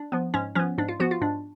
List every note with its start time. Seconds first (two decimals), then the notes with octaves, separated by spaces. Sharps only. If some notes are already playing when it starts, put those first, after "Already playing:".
Already playing: D4
0.12 F3 B3
0.34 G#2 C#4
0.55 F3 B3 C#4
0.78 G#2 D4
0.88 F4
1.00 F3 B3 F#4
1.11 F4
1.21 G#2 D4